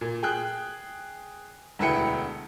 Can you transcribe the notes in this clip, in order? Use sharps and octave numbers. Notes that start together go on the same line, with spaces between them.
A#2
G#4 G5 F#6
E1 D2 E4 B4 G5 C#7